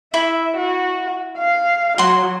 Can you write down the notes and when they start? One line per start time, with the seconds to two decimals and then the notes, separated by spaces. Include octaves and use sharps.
0.14 E4 E5 B5
0.57 F#4
1.38 F5
1.98 F#3 F#4 C6